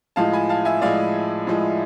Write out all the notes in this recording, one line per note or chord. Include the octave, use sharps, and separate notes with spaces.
A2 F3 G#3 F5 A5
G#5 B5
F5 A5
E5 G#5
A2 F3 G#3 D5 F5
A2 F3 G#3